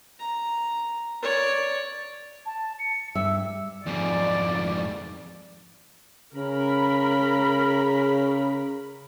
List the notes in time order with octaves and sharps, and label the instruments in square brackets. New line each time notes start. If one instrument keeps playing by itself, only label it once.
[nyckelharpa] A#5
C#5 D5
[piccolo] A5
C#7
[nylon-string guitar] G2 G3 E5 [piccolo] E6
[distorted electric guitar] F2 G#2 [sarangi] D5
[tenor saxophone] C#3 [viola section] A#4 B5